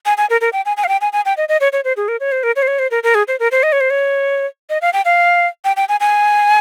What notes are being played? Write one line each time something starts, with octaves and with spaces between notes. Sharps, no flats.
G#5
G#5
A#4
A#4
G5
G#5
G#5
F5
G5
G#5
G#5
G5
D#5
D#5
C#5
C#5
C5
G#4
A#4
C#5
C5
A#4
C#5
C5
C#5
C5
A#4
A#4
G#4
C5
A#4
C5
D#5
C#5
C5
C#5
D#5
F5
G5
F5
G5
G5
G#5
G#5